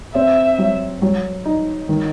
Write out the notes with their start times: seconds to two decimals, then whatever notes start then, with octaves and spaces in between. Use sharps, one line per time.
0.15 C4 E5
0.58 F#3
1.02 F#3
1.45 D#4
1.89 D#3